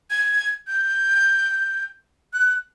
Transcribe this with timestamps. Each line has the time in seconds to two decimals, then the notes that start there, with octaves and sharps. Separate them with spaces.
0.11 G#6
0.67 G6
2.33 F#6